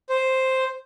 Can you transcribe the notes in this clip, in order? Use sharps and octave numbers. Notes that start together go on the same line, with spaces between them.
C5